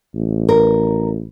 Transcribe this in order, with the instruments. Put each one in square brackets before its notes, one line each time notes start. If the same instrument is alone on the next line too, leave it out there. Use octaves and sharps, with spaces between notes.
[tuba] A1
[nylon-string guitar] A#4